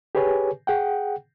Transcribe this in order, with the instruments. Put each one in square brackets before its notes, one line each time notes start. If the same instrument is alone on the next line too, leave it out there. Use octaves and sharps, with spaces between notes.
[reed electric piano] G4 G#4 B4 C#5 G#5
G#4 F#5 G5